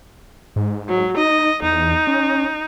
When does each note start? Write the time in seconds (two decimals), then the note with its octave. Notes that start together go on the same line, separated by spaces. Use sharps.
0.56 G#2
0.88 F#3
1.17 D#4 D#5
1.62 E2 D#4
2.07 C#4